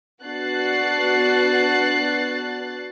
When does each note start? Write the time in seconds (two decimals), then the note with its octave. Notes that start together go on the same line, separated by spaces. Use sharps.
0.23 B3 D4 F#4 F#6 A6 C7